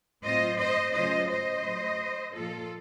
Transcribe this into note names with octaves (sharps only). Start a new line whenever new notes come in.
A2 F#3 C4 F4 C5 D#5
C5 D#5
C#3 F#3 A3 C#4 F4 C5 D#5
C5 D#5
A2 F#3 A3
A#2 F3 A#3 F4 A4